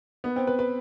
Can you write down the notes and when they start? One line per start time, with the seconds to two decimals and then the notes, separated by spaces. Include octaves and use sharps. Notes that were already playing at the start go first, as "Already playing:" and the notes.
0.24 B3
0.36 C4
0.47 B4
0.59 B4